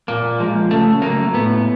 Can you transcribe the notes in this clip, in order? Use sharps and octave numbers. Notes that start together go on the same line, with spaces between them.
A#2 A#3
F3 G#3
C#3 A3
F#3 A3 A#3
A2 B3